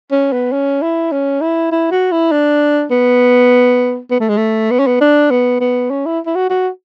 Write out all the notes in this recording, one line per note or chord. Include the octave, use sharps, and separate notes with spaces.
C#4
B3
C#4
E4
C#4
E4
E4
F#4
E4
D4
B3
B3
A3
G#3
A3
B3
C#4
B3
D4
B3
B3
C#4
E4
E4
F#4
F#4